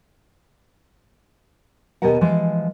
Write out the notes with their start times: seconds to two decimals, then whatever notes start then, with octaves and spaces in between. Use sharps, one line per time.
2.02 D#2 B2 B3 G4 A#4 F#5
2.21 E3 F3 G#3